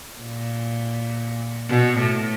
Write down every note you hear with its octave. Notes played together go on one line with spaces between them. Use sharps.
A#2
B2
A2